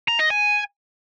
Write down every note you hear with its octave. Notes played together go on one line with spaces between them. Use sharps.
A#5
D#5
G#5